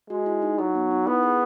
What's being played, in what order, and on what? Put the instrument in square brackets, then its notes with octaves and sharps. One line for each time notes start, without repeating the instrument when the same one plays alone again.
[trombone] G#3 [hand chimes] F#4
[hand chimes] E4
D#4
[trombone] F#3 [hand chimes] D#4
[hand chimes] B3
D#4
[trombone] B3 [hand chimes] E4
[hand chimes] G#4 B4